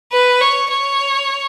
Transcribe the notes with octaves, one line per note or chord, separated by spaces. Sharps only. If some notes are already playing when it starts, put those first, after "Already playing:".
B4
C#5
C#5